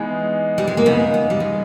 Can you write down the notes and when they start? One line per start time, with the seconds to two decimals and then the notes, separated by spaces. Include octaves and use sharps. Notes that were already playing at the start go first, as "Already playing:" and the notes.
Already playing: E3 G#3 B3 D#4 G#4
0.58 G3
0.68 G#3
0.77 A#3
0.86 C#3 G#3 B3 D#4
1.14 B3
1.30 G3
1.40 G#3